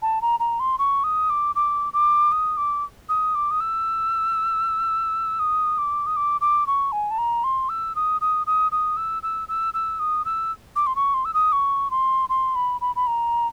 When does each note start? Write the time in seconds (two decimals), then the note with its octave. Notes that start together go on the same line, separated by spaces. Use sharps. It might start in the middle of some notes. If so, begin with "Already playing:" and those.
0.02 A5
0.22 A#5
0.40 A#5
0.60 C6
0.79 C#6
1.04 D#6
1.30 D6
1.55 D6
1.93 D6
2.32 D#6
2.57 D6
3.09 D#6
3.35 D6
3.51 D#6
3.60 E6
5.39 D#6
5.78 D6
6.06 D#6
6.16 D6
6.41 D6
6.67 C#6
6.92 G#5
7.11 A5
7.18 A#5
7.44 C6
7.69 E6
7.95 D#6
8.21 D#6
8.47 D#6
8.72 D#6
8.97 E6
9.23 E6
9.48 E6
9.74 E6
9.99 D#6
10.25 E6
10.76 D6
10.87 C6
10.96 C#6
11.14 C6
11.25 E6
11.34 D#6
11.52 C#6
11.91 C6
12.29 C6
12.55 B5
12.81 B5
12.96 B5
13.07 A#5